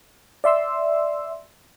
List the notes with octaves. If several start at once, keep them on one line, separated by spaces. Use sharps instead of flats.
D5 E5 C6 E6